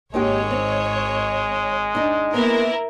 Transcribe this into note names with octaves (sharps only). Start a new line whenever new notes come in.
G#1 G#3 A#3 D#4 G4 C#5
C4 D#4
D4 D#4
A#3 B3 E4 A#4